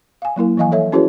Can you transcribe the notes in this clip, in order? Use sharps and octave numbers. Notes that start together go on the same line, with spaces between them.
F5 G#5
F#3 A#3 E4 A#4
E3 F3 D#5 F5 G#5
A4 C#5 E5
C#4 E4 F#4 G#4 B4 C#5